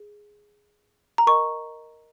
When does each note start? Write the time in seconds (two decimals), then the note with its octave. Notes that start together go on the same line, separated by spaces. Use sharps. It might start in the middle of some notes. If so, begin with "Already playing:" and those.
Already playing: G#4
1.18 A#5
1.27 A#4 D#5 C#6